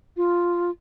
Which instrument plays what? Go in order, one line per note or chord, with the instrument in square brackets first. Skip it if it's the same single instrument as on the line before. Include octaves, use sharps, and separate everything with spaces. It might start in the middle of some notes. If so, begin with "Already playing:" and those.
[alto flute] F4